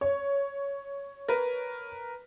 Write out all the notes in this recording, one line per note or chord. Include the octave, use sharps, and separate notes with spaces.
C#5
A#4 B4